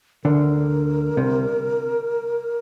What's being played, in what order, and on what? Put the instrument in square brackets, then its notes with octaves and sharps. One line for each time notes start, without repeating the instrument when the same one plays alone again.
[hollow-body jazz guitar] D2 D3 [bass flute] A#4
[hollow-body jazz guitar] C2 C3